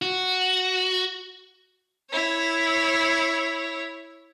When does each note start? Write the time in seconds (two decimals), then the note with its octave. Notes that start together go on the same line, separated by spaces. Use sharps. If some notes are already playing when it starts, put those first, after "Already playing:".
0.02 F#4
2.11 E4 C#5